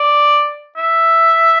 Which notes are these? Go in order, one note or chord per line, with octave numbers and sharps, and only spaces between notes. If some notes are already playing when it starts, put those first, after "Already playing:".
Already playing: D5
E5